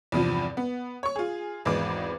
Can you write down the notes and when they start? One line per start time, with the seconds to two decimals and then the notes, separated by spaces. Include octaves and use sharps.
0.12 E2 G2 C3 F3
0.57 B3
1.03 C#5 C#6
1.16 F4 G#4
1.65 G#1 E2 G#3 B4 D6